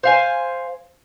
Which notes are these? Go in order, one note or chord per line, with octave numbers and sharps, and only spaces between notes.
C5 F5 G#5